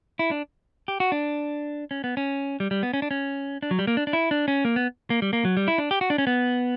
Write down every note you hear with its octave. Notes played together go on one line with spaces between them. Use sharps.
E4
D4
G4
F#4
D4
C#4
B3
C#4
G3
G3
B3
C#4
D4
C#4
D4
F#3
G3
A#3
D4
D4
E4
D4
C#4
A#3
B3
A#3
G3
A#3
F#3
G3
E4
D4
G4
F#4
D4
C#4
B3